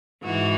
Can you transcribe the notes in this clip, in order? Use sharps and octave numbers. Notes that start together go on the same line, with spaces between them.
G#2 E3 F#4